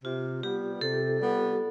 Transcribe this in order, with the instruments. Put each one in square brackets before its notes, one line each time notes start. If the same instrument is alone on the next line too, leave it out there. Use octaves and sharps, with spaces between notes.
[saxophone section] C3 [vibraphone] F4
[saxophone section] G3 B3 [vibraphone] G4
[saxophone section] C3 [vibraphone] A4
[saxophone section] G3 B3